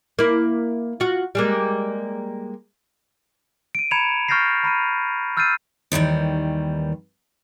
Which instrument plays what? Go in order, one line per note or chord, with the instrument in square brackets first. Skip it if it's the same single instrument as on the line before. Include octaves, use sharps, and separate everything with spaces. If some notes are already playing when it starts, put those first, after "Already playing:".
[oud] A#3 E4
F4 F#4
G3 G#3 A#3
[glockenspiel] D7 D#7
A#5 B5 G#6 C#7 E7 F7
C#6 F6 G6 A6 A#6 C7
A#5 B5 F6 D#7
E6 F6 G6 A6 C7 D#7
[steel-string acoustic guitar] D#2 D#3 E3 G3